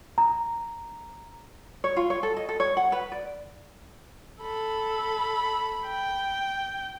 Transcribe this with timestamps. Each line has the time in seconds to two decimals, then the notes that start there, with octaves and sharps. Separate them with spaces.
0.18 A#5
1.84 C#5
1.96 F4
2.10 C#5
2.23 A4
2.37 D#5
2.49 A4
2.60 C#5
2.77 F#5
2.92 B4
3.12 D5
4.42 A4 B5
5.86 G5